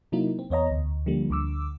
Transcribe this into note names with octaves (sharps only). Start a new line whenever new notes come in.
C3 F#3 A#3 D#4 E4
C4
E2 B3 C#5 D#5 A#5
D2
D3 F3 G3 A#3
D2 D3 D6 E6